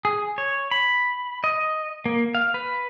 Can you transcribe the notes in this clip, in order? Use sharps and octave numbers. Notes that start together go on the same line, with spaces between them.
G#4
C#5
B5
D#5
A#3
F5
B4